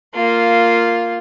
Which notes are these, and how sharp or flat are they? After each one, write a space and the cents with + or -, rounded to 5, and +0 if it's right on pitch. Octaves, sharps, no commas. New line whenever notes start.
A#3 -10 F4 +0